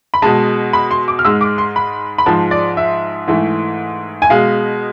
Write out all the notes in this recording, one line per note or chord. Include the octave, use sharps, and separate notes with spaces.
B5
B2 G#3 A5
B5
C6
D6
F6
G#2 G#3 E6
D6
C6
B5
B5
G#2 F3 G#3 A5
D5
E5
G#2 E3 A3
G#5
B2 G#3 F5